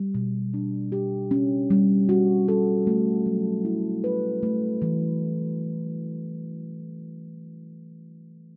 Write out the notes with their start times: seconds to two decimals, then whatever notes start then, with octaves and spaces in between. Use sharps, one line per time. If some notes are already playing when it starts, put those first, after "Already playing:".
Already playing: G3
0.15 B2
0.54 D4
0.92 G4
1.31 C#4
1.70 G3
2.09 F#4
2.48 A4
2.87 A3
3.26 F#3
3.65 E4
4.04 B4
4.43 A3
4.82 E3